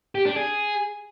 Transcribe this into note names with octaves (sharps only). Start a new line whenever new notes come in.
G4
D4
G#4